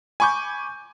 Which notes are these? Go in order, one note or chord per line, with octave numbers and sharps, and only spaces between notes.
G#5 B5 C#6 D6 G6